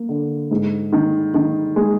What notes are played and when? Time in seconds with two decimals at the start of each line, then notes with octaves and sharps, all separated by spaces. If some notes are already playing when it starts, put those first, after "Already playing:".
Already playing: A#3
0.09 D3
0.51 G#2
0.93 D#3
1.34 D#3
1.76 G#3